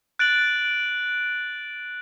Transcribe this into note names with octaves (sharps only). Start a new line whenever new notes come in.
F#6 A6 D7 F#7